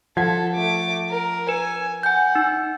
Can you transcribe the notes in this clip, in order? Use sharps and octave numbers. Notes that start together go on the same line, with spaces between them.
F3 A4 F#5 G#6
A3 D6
A#4
B4 G#5
F#5 G#5 G6
D#4